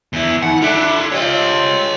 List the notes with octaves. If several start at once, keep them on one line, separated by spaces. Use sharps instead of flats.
E2 E4
D#3 F#5
D4 F4 A4 E5
C4 F4 G4 C#5 D#5